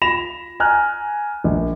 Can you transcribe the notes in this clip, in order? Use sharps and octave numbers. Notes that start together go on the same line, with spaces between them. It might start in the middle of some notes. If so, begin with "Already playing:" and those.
F4 B5 A#6 E7 F7
G#5 A#5 F6 F#6
A#1